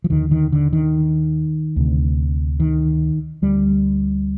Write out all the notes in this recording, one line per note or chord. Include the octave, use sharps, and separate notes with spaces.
F3
D#2 D3 D#3
D#3
D3
D#3
D2 C3
D#3
D2 D3 G3